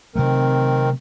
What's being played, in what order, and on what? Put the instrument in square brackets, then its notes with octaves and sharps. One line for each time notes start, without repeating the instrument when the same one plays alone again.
[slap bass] C3 F#3 A3 [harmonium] D#3 C4 A#4